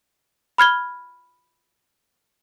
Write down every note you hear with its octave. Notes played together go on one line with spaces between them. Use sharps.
B5 F6 G#6 G7